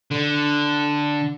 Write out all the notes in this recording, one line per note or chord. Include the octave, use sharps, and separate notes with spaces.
D3